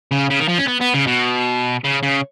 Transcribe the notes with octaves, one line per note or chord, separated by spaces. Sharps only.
C#3
C#3
D#3
F3
C#4
B3
B3
C#3
B2
C#3
C#3